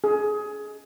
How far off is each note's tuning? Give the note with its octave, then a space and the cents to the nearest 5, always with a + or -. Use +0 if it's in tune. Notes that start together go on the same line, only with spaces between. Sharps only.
G#4 +20